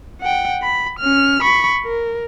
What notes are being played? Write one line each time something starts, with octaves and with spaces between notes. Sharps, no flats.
F#5 G5
B5
C#4 F6
B5 C#6
A#4